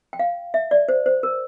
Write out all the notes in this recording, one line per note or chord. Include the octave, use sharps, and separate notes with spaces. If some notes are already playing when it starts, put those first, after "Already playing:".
G5
F5
E5
D5
C5
C5
A#4